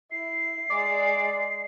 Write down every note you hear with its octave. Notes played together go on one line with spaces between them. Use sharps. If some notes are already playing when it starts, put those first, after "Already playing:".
E4 C7
G#3 D5